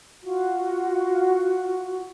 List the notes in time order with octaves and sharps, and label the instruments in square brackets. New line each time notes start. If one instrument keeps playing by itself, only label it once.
[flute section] F4 F#4